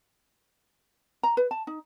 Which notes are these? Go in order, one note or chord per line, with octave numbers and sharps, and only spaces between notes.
A#5
B4
A5
D#4